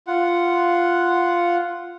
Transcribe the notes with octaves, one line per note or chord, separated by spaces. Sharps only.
F4 F#5